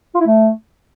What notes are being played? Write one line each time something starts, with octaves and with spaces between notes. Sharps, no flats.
F4
E4
A3